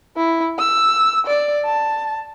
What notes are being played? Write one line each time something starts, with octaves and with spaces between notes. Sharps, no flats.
E4
E6
D5
A5